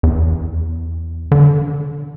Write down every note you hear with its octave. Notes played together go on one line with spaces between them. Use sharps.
E2
D3